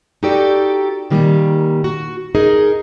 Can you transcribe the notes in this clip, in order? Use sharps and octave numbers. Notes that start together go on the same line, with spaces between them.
D#4 F#4 G4 A4 D5
A#2 D#3 G3 A#3
F#4
D#4 G#4 A#4 D#5